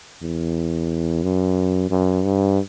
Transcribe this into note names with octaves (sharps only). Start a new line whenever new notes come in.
E2
F#2
F#2
G2